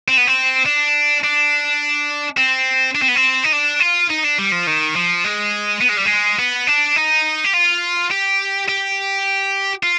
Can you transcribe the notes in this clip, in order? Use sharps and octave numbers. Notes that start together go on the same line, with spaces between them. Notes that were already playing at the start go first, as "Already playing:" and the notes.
C4
B3
C4
D4
D4
C4
D4
C4
B3
C4
D#4
D4
F4
D#4
D4
G3
F3
D#3
F3
G#3
B3
G#3
G3
G#3
B3
D4
D#4
G4
F4
G4
G4
F4